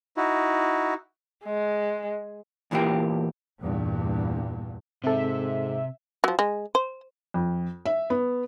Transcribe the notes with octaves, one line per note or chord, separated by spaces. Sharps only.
D#4 E4 F#4
G#3
E2 A#2 E3 A#3 G4
E2 G2 A#2
G#2 C3 C4 A4 E5
F3 F#3
G#3
C5
F2
E5
B3